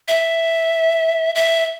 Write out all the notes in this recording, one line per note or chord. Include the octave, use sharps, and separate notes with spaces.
E5
E5